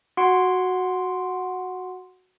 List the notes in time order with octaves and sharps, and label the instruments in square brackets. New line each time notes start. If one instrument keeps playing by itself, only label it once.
[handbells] F#4 F#5 C6 D7